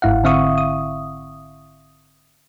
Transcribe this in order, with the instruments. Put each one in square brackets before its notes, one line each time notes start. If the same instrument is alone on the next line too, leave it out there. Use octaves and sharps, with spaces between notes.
[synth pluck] G1 G#2 E4 F5 F#5
D3 C4 E5 F5 C#6 D#6
D#6